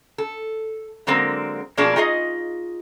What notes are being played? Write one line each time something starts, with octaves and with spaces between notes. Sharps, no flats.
A4
D3 F#3 G#3 A#3 C4 A#4
B2 F3 A#3 D4 G#4 A5
D#4 F4 G#4 D#5